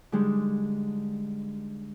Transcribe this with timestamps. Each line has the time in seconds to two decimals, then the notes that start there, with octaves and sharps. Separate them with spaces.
0.12 D3 G3 G#3 D#4